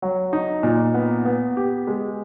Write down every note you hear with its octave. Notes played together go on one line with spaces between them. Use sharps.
F#3
D#4
A#2
B3
B3
G4
G#3